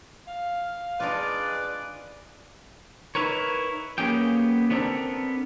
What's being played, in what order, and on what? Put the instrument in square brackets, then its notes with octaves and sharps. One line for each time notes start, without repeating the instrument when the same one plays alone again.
[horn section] F5
[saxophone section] G#3 B4 D5 [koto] D4 D#4 F4
[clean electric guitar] D#4 E4 A#4 B4 C#5
A#3 B3 C#4 G4 G#4 G5
B3 C4 D4 G4 A4 A#4